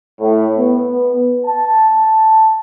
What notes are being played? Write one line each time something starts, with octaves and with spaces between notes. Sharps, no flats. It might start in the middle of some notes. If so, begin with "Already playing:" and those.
A2
B3
A5